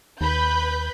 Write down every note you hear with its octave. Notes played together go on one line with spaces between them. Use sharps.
D#2 B4 B5 G6